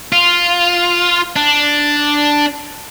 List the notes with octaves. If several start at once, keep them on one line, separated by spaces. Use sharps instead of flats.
F4
D4